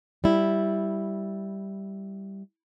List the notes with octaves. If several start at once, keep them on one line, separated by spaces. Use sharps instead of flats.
G3 E4